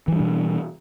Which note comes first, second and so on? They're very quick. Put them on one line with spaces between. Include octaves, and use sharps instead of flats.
E3 G3 D4 B2